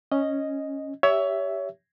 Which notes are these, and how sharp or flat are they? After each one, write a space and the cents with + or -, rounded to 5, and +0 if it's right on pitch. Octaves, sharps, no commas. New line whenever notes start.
C#4 -5 D#5 +0
G4 +0 C#5 +25 E5 +0